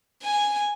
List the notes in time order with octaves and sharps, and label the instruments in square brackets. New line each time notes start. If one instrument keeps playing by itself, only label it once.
[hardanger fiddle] G#5